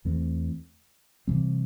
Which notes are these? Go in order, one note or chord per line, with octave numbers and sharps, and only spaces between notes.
E2 E3 A3 C4
C3 E3 G3 C4